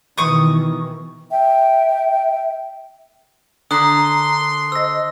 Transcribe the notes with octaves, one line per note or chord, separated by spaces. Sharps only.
B2 D#3 E3 C#6 D#6
E5 G5
D3 A#5 C6 D#6 F#6
C5 D#5 E6 A#6